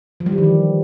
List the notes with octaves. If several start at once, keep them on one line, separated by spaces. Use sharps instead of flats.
F3
G3
E3
D#3
F3